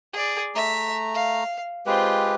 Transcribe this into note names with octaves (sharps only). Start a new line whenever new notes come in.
G#4 D5
A3 E5 A#5
F5
G#3 C4 F4 G4 B4